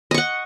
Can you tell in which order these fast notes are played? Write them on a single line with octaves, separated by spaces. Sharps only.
D#5 C#6 F#5